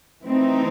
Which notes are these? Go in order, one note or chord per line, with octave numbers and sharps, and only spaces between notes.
E3 A3 C4 D#4